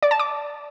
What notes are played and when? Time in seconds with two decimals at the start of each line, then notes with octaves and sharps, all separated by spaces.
0.03 D5
0.11 A5
0.19 D6